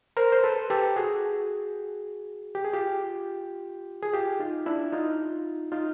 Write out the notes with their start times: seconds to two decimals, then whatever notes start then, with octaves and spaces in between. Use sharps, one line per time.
0.17 A#4 C5
0.32 C5
0.44 A4 B4
0.70 G4 A4
0.96 F#4 G#4
2.55 G4
2.65 G#4
2.73 F4 G4
4.02 G#4
4.14 F4 G4
4.40 D#4 F4
4.66 D4 E4
4.93 D#4 F4
5.72 D#4 F4